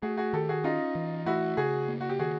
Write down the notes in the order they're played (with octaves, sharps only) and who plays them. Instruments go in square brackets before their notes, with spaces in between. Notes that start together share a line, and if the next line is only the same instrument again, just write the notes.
[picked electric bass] A3 [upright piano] F#4 G#4
[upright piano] F#4 G#4
[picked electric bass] D#3 [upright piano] G4 A4
[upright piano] F#4 G#4
[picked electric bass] C#4 [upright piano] D#4 F4
[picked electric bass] E3
[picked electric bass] A3 [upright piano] E4 F#4
[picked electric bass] C#3 [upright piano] F#4 G#4
[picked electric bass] A#3
[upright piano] F#4
G4
[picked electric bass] D#3 [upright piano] F#4 G#4